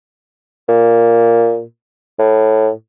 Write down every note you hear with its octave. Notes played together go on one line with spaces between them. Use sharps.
A#2
A2